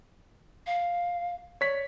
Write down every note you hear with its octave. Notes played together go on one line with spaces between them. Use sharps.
F5
C#5 D5 B6